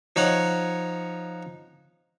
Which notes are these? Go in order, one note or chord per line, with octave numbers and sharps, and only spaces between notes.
F3 D#4 C#5 F#5